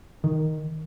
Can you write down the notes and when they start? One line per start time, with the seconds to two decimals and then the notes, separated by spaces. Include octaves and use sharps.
0.24 D#3